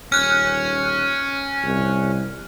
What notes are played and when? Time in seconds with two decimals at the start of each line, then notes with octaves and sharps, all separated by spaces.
0.12 D#1 C#4 F6 F#6
1.63 C2